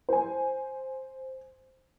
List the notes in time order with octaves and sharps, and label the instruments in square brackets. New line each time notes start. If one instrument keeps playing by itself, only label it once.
[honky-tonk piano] C5 G#5